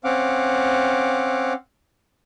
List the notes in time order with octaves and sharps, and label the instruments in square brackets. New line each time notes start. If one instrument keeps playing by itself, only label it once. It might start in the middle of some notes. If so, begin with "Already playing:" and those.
[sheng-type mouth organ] C4 C#4 F5 F#5 D6